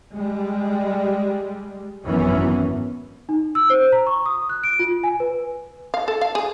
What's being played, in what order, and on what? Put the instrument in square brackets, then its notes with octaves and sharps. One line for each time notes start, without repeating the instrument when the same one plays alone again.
[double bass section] G3 G#3
G#1 F#2 E3 B3 C#4
[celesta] D#4
E6
C5
A#5
C#6
D#6
F#6
D7
F4
G#5
B4
[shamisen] F5
A4
F5
G#4